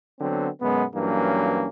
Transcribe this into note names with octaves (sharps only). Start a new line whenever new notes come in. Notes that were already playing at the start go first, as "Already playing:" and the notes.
D3 F#3 B3 C4
F#2 B2 G#3 B3
G2 E3 F#3 A#3 C#4